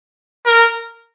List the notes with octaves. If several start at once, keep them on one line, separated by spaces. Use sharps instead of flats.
A#4